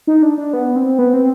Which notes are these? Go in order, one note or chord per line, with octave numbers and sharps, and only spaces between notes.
D#4
D4
D4
B3
C4
B3
C4